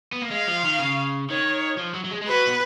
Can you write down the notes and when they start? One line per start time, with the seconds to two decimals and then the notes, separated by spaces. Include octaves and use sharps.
0.12 B3
0.22 A#3
0.31 G#3 F5
0.48 F3
0.65 D#3
0.80 C#3
1.30 D#3 C#5
1.79 F3
1.95 F#3
2.05 F#3
2.12 G#3
2.22 G#3
2.28 F#3 B4
2.47 B3